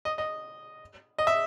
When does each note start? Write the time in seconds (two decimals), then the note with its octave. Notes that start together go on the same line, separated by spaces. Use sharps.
0.05 D#5
0.18 D#5
1.18 D#5
1.27 E5